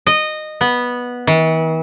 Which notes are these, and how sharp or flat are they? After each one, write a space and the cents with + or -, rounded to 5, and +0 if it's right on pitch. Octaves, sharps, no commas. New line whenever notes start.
D#5 -15
B3 -10
E3 -45